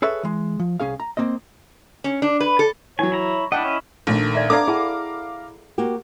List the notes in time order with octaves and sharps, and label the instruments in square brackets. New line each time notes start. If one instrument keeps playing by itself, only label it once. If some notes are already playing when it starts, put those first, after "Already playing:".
[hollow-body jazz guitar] G#4 A4 B4 C#5 E5
E3 G#3
F3
C2 C#4 G#4 F5
A#5
A#3 C4 C5 D#5
[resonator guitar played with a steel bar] C#4
D4
B4
A4
[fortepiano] E3 F#3 [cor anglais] C#5 [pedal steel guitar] G#5
[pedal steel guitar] E4 A#5
[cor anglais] D4 [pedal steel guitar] E4 D#5 [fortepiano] F#5 G5
[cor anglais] C#4
[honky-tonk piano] A#1 [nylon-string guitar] D#3 A3 D4
[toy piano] D5 E5 A#5
[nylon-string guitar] B3 D4 [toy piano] A4 D5 [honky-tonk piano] F5 A#5 D6
[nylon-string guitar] E4 [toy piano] G#4 F#5 A5
[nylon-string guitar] A#3 F#4 G4